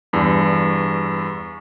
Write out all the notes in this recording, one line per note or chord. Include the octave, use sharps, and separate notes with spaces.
E2 G2